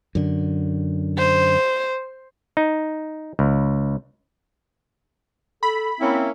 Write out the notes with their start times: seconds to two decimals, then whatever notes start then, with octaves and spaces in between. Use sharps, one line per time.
0.15 F#2 D3
1.18 C5
2.57 D#4
3.39 C#2
5.63 A4 B5
6.01 A#3 C4 C#4 E4